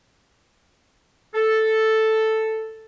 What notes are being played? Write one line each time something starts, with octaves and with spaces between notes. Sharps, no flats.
A4